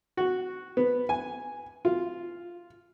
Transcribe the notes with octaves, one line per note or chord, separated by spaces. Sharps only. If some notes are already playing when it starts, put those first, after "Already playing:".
F#4
B3
G#5
F4